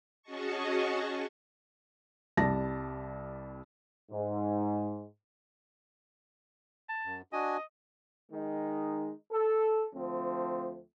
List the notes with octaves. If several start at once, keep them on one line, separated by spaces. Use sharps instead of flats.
C#4 F#4 G#4 D#5 A5 C#6
C2 G3 A5 A#6
G#2
A5
F#2
D4 F#4 D#5 G#5
D#3 G#3 D#4
A4
D2 F3 A3 C4